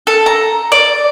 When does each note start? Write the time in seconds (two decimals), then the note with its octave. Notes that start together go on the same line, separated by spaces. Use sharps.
0.07 A4
0.26 A#5
0.72 D5